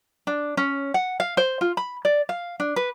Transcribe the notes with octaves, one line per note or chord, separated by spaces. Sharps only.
D4
C#4
F#5
F5
C5
F4
B5
D5
F5
D4
B4